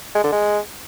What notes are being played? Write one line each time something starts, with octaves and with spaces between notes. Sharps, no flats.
G#3
D3
G#3